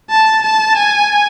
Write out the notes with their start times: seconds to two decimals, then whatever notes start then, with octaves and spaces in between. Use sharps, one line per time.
0.10 A5
0.44 A5
0.78 G#5